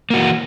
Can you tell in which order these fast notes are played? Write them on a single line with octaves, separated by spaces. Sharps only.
A#3 F#4 E3